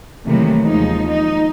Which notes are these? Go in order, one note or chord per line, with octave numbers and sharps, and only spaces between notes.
C3 D#3 E3 F#3 A3 A#3
D#2 F3 G#3 D#4
D#4